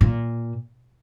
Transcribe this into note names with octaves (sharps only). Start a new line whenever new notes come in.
A#2